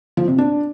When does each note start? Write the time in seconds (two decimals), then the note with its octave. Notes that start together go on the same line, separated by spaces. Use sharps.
0.17 F3
0.28 C3
0.38 D4